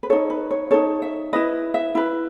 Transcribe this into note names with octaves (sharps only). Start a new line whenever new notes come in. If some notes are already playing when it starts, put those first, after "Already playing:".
B4
D#4 A4 C#5
B4
C#5
D#4 A4 C#5
E5
E4 B4 D#5
E5
E4 B4